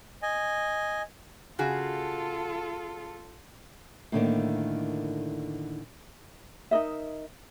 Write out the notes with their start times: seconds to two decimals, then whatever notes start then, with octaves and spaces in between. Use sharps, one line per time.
0.22 D#5 G#5
1.59 C#3 F4 F#4 G#4 A4
4.12 A2 D3 D#3 A#3
6.71 D#4 A#4 D#5 E5